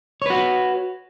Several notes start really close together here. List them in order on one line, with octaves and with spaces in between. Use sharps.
C#5 B4 F#4